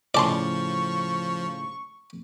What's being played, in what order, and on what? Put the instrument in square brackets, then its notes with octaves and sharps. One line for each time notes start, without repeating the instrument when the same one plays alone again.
[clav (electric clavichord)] A2 C#3 [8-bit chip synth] F3 [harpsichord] D5 A5 C6 [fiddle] C#6